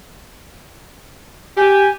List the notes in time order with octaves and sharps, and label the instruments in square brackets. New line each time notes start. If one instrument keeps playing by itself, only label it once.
[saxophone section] G4 [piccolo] G#5